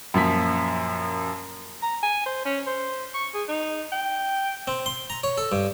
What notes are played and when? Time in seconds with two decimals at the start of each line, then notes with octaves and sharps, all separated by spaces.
0.14 F#2 A#2 F3 B6
1.83 A#5
2.03 G#5
2.26 C5
2.45 C#4
2.67 C5
3.14 C#6
3.34 G#4
3.48 D#4
3.92 G5
4.67 C4
4.86 C6
5.10 A#5
5.24 C#5
5.38 A4
5.52 G2